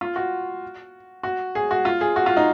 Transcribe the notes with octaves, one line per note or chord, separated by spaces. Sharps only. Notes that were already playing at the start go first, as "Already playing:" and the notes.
F4
F#4
F#4
G#4
F#4
F4
G#4
F#4
F4
D#4